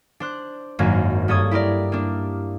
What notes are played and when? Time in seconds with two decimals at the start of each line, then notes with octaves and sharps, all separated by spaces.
0.20 D4 C5 F#6
0.79 G#1 F#2 A#3 G#6
1.28 G2 A#3 A4 C#5 D#6 G#6
1.51 E4 G4 A#4 D5
1.92 A#3 D4